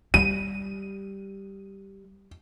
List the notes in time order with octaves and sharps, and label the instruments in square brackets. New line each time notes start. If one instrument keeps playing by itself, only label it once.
[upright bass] G3 [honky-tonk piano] D#7